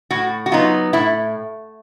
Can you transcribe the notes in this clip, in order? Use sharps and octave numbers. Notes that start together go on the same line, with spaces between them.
A2 F#4
F#4
F#3 B3 D#4 F4
A2 E4